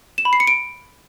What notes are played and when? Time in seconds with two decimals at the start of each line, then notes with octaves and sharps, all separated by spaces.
0.18 E7
0.25 B5
0.33 C7
0.40 C#7
0.47 D7